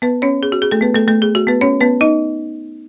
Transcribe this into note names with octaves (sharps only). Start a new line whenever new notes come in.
B3 B4
C#4 C#5
G#4
F#4
G#4
A3 A4
B3 B4
A3 A4
A3 A4
G#4
F#4
B3 B4
C#4 C#5
B3 B4
D#4 D#5